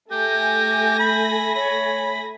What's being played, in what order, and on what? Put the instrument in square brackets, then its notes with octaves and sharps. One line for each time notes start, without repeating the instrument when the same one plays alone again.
[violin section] A3 G#5 A#6 [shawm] G4 [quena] G6
[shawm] B5
[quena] C#5 [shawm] B5